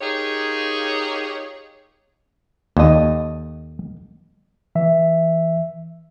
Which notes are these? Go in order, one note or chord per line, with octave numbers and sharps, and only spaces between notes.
D#4 F4 G4 G#4 A#4 C#5
D#2 A4 D#5
E3 E5